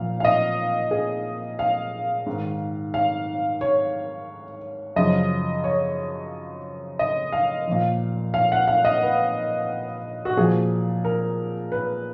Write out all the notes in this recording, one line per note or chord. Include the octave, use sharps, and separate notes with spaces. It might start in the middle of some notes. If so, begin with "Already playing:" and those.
Already playing: A#2 F3 F5
F5
D#5
G#4
F5
G#2 D#3
F5
C#5
F#2 C#3 F3 D#5
C#5
D#5
F5
A#2 F3
F5
F#5
F5
D#5
B4
F#4
A#2 F3 G#4
A#4
B4